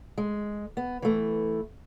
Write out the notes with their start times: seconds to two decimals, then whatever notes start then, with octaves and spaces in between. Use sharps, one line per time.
0.18 G#3
0.77 B3
1.02 E3 A3